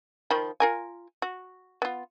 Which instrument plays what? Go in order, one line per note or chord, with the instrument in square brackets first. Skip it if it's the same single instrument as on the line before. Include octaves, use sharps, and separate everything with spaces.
[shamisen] D#3 F3 B5
F4 A#4 G#5
F#4
B3 F4